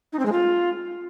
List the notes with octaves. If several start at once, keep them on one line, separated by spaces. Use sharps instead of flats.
D#4
C4
G#3
F4